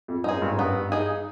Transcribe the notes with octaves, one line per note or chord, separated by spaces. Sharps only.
F2
F#2 D#4 G#4
G2
F#2
G2 B3
D#4 G#4